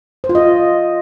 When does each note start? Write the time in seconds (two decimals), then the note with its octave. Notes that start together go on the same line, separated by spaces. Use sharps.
0.24 C5
0.29 F4
0.35 D#5